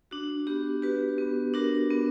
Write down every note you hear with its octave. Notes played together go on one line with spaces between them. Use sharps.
D4 F#4
B3 G4
F#4 G4 B4
B3
D4 F#4 A#4
B3